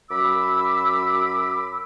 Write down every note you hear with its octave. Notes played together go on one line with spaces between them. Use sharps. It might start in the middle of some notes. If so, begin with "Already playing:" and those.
F#2 F#4 B5 D6 E6